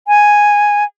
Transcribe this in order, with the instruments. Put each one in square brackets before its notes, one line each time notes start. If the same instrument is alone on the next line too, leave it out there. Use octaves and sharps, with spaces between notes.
[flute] G#5